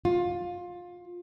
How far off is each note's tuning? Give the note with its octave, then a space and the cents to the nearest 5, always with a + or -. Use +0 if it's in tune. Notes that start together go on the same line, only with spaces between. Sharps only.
F4 +20